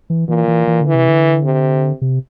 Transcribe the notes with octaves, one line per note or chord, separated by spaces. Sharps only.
E3
A#2 E3
E3
E3
D3
E3
C3
D3
C3
C3